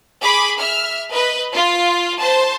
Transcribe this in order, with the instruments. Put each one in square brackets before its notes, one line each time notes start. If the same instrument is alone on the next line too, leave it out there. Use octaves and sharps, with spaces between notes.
[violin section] G#4 B5 D6
E5 F6
B4 D#5
F4
C5 A5